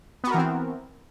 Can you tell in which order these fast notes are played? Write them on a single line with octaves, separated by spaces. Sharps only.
B3 F#4 A#4 E3 C4